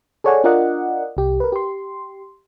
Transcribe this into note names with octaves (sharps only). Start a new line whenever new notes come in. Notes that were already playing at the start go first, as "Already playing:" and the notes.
G#4 A4 C#5 D5 F#5 G#5
D4 F4 A#4 D5 D#5 F#5
C2 G4
A#4 B4
G4 C6